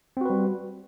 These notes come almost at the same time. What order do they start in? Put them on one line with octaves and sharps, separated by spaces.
C4 F#4 B4 G3